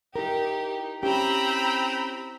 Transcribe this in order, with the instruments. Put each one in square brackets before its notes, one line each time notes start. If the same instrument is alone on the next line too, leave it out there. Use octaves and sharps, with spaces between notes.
[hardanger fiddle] D#4 [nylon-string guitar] E4 A#4 [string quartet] G4
[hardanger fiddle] C4 A#5 [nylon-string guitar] C#4 E4 G4 [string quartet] G5 B5 E6